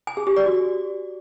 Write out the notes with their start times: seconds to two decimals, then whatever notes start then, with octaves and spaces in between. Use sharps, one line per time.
0.07 G#5
0.17 G#4
0.27 G4
0.36 D5
0.46 F#4